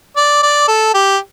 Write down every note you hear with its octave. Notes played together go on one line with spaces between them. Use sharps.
D5
D5
A4
G4